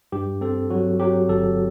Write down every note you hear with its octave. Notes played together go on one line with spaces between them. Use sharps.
G2 G4
C4 A4
F#3 F#4
F#3 G4
G1 A4